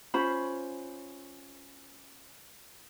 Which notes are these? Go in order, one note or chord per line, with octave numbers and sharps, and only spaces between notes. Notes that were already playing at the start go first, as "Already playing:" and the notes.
C#4 F4 C5 B5